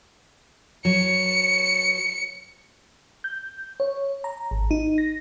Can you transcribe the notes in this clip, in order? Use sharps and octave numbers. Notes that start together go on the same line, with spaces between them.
F#3 C#7
G6
C#5
A#5
G#1
D#4
A#6